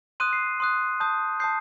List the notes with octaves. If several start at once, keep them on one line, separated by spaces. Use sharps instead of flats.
C6 D#6 F#6 D#7
C7
C6 D#6 F#6
A5 D#6 G6
A5 D#6 G6 C7